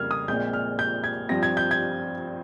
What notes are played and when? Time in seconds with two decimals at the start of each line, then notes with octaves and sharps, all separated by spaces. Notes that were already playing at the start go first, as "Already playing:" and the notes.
Already playing: F2 C#3 G3 A#3 F6 G#6
0.11 D#6
0.28 A#1 A#2 G#3 C4 G6
0.53 F6
0.79 G6
1.04 G#6
1.29 G2 F3 C4 A#6
1.43 G#6
1.57 G6
1.71 G#6